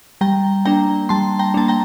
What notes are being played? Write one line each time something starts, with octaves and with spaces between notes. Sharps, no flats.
G3 G5 A#5
A#3 D4 G5 A#5
G3 A5 C6
G5 A#5
A#3 D4 A5
G5 A#5